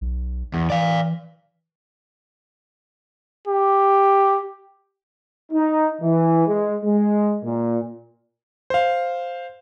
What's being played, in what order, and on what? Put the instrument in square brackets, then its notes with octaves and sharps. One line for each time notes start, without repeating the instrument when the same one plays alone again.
[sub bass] B1
[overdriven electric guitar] E2
[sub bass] E3 [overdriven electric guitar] D5 F5
[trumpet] G4
[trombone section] D#4
E3
G#3
G#3
A#2
[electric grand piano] C5 F5